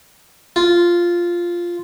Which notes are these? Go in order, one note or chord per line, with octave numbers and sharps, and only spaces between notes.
F4